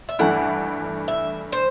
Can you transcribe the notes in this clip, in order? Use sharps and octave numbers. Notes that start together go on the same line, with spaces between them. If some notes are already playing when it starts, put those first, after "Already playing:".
E5
G2 E3 A3 E4 F#5
E5
C5